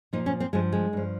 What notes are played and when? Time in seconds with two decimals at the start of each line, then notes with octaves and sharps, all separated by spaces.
0.13 A#2 F3 D#4
0.26 C#4
0.40 C4
0.53 G2 F3 G#3
0.72 G#3
0.93 G2 F3